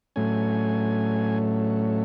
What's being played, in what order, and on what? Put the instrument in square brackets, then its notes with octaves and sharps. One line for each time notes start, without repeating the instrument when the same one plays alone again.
[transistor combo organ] A2 F#3 A3 C#4 G#5